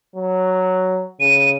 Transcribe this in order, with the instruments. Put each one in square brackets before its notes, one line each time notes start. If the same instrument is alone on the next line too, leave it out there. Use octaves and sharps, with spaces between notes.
[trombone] F#3
[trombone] C#3 [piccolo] D#7